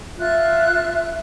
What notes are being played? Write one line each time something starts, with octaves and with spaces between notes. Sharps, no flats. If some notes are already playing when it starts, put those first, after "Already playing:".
F4 E5 F#6